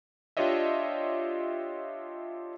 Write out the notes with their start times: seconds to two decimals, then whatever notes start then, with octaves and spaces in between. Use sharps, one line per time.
0.37 D4 F4 G4 C#5 D#5 E5